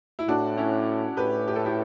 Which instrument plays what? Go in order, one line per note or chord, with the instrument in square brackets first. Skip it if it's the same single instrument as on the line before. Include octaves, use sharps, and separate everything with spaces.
[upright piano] E4
[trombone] A2 [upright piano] D4 F#4
[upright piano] C#4 E4
[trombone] A2 [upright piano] G4 B4
[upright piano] G4
A4
E4 G4